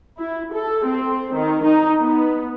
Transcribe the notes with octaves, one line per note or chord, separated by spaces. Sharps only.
E4
A4
C4
D#3
D#4
B3